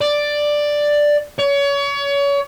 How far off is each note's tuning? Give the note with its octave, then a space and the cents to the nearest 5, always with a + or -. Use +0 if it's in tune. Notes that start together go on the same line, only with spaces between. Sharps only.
D5 +5
C#5 +30